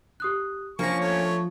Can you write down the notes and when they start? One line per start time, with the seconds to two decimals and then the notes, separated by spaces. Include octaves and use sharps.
0.20 G4 D#6 F#6
0.79 F3 A#3 C#4 D4 C#6 A#6
1.01 A3 C#5